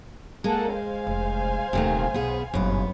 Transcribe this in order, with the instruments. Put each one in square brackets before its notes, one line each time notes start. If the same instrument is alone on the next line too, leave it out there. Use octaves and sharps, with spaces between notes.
[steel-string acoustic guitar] G#3 [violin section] A#3 A4 F#5
[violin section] C5 F5 G#5
[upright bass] F1
[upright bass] D#1 E3 [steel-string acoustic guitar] C3 D#3 A3
[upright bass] B1 [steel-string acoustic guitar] B3 G#4
[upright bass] G1 A#2 [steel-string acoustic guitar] F#2 B3